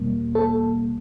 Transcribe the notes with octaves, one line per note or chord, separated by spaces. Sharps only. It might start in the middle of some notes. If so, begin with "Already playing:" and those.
Already playing: E2 B2 G3 A#3
A4